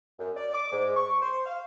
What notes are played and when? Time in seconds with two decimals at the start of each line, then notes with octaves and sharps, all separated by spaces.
0.19 F#2
0.37 D5
0.54 D6
0.72 G#2
0.96 C#6
1.21 C5
1.46 F5